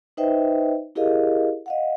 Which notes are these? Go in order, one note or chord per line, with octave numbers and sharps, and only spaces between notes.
D#4 B4 C5 D#5 E5 G5
E4 G4 G#4 A#4 D#5 F5
D#5 F5 F#5